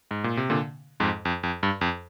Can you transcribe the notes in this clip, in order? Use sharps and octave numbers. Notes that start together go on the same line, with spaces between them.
G#2
A#2
C3
A#2 D3
F2 G#2
F2
F2
G2
F2